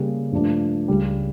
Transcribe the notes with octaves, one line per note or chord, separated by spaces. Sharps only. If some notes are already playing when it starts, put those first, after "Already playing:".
Already playing: C#3 G3 A#3
G2 F3 A3 D4
C#2 C#3 G3